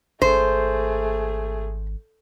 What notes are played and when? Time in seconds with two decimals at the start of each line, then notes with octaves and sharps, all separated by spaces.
0.22 G#1 A3 G#4 C5